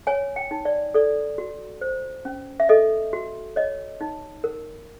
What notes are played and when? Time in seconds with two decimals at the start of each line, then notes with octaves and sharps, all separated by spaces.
0.07 C#5 G#5
0.36 G5
0.51 D#4
0.65 D5
0.94 A4 D5
1.38 F#4
1.81 C5
2.25 C#4
2.60 E5
2.69 A4 D#5
3.13 F#4
3.56 C#5 D#5
4.01 D#4
4.44 A#4